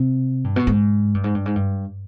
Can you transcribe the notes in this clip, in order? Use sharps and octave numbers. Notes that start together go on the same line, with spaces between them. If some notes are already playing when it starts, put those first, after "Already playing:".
Already playing: C3
G2
B2
G#2
G2
G#2
G2
G#2
G2